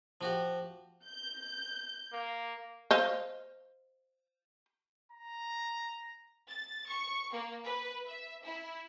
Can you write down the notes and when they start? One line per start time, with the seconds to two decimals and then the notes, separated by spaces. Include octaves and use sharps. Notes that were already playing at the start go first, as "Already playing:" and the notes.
0.21 F3 F#4 G4
1.04 G6
2.13 A#3
2.91 C5 D#5 F5
5.12 A#5
6.48 A6
6.88 C#6
7.33 A#3
7.65 B4
8.06 E5
8.43 E4